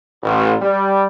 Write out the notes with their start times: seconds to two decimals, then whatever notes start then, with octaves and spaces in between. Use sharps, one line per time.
0.22 A1
0.60 G3